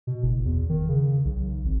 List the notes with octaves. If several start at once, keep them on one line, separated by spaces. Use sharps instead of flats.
B2
F#1
E2
D#3
C#3
B1
G#1